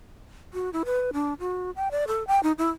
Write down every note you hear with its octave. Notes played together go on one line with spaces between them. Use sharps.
F#4
E4
B4
D4
F#4
G5
D5
A4
G5
D#4
E4